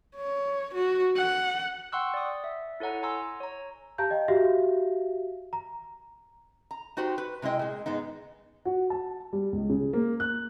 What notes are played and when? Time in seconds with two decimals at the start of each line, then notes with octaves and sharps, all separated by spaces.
0.16 C#5
0.74 F#4
1.17 F#5
1.92 F#5 G5 C6 C#6 E6 F#6
2.14 D5 D#6
2.44 E5
2.80 E4 A4 C#5 F#5 A#5
3.03 G#5 A#5 C6 E6
3.40 C#5 A#5
3.98 G4 F5 A5 A#5 G6
4.11 D#5 G5
4.28 F#4 G4 E5 F5
5.53 A#5
6.71 A#5
6.97 D#4 F#4 G4 C5
7.18 B4
7.42 C3 G#3 E4 D#5 G5
7.59 A#2 G#3
7.86 G#2 G#3 B3 D#4
8.65 F#4
8.90 A5
9.33 G3
9.52 C#2
9.69 C#3
9.93 A#3
10.20 F#6